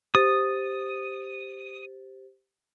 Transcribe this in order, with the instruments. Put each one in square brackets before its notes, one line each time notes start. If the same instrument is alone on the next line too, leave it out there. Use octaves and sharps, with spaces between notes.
[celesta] G4 C5 A6 [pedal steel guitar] D#6